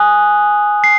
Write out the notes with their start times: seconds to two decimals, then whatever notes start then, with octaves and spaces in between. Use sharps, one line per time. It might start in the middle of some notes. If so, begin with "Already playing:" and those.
Already playing: G#5 D#6 F#6
0.84 C7